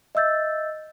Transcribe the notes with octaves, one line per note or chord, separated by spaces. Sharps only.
D#5 E5 E6 G6 A6